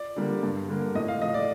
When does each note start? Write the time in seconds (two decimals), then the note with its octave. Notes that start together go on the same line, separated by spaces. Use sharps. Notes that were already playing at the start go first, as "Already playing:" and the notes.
Already playing: D5
0.16 D3 G3 A#3
0.43 G2
0.69 D3 G3 A#3
0.95 A2 D#5
1.08 F5
1.21 F3 D#5
1.25 A3
1.34 D5